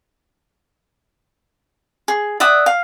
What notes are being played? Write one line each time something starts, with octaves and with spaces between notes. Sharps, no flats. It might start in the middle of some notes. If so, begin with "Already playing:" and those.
G#4
D5 E5 F#5 D#6
F5